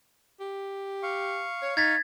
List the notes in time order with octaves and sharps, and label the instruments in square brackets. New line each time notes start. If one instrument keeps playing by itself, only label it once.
[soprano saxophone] G4
[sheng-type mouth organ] F5 C#6
[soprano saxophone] C#5
[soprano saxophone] D#4 [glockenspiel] G#6 A6 B6